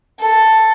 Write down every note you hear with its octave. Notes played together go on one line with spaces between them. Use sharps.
A4